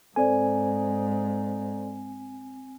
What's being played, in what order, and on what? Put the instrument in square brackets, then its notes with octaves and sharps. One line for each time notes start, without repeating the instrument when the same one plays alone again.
[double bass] G#2 [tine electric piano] C4 G#5 [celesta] A4 C5 D5